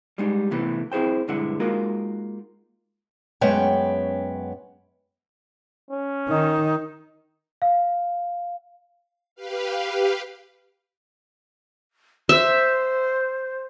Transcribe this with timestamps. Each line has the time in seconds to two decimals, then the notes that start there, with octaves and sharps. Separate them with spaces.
0.18 G3 G#3 D#4
0.51 A2 C3 E3 A3 B3
0.92 C4 E4 G#4 C5 G5
1.28 B1 G2 D3 G#3 E4 F#5
1.60 G#3 A#3 D#4 F4 F#4 A#4
3.41 F#2 G#3 B3 C#4 C#5 G5
5.91 C#4
6.28 D#3 D#4
7.62 F5
9.35 G4 B4 F5
12.29 C5 E5